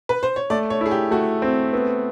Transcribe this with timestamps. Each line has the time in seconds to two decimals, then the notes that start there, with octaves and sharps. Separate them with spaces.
0.09 B4
0.23 C5
0.36 C#5
0.50 A3 D5
0.70 C#5
0.81 E4 G#4
0.91 G4
1.11 A3 F#4
1.42 C4
1.73 B3